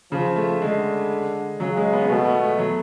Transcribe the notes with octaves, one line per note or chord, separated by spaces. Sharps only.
C#3 F3
A3
D3 G#3
C#3 F#3
G#3
B3
B2 A3
B3
A3
F#3